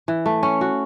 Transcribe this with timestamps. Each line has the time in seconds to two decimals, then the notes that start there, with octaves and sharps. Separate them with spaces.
0.08 E3
0.26 A3
0.43 C#4
0.61 F#4